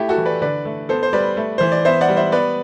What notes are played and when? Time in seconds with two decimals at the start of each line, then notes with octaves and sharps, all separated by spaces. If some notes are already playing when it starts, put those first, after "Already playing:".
Already playing: A3 E4 G4
0.09 F#4 A4
0.18 E3
0.26 B4 D5
0.42 D3 B4 D5
0.65 A3
0.89 B3 A4 C5
1.03 C5
1.13 G3 B4 D5
1.37 A3
1.58 E3 C5
1.72 D5
1.85 B3 C5 E5
2.01 D5 F#5
2.09 G3
2.17 C5 E5
2.32 B3 B4 D5